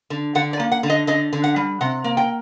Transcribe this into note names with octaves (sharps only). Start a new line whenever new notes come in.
D3
D3 F#5
D5
A#3
F#5
D3
D#5
D3 D#5
D3
F#5
G3
C3 F#5
A#3
G5